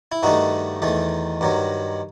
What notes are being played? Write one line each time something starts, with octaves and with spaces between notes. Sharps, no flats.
E4
G2 D#3 A3 D#4 F#4
E2 D#3 A3
G2 D#3 F#3